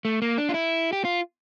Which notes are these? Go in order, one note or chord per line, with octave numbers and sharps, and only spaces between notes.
A3
A#3
D4
F4
E4
G4
F4